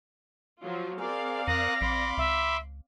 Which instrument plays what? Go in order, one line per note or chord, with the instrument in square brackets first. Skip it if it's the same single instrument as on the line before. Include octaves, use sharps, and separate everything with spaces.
[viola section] F3 F#3 F4
[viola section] C4 D5 F5 [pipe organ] G#4 A#4
[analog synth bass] F2 [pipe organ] A#4 D#6 F#6 [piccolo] A#6
[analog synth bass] A#1 [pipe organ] B5 C6 D6
[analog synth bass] C#2 [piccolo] E5